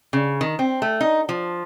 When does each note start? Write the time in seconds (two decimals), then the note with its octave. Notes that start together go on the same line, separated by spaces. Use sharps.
0.13 C#3
0.41 D#3
0.59 C4
0.82 A3
1.01 D#4
1.29 F3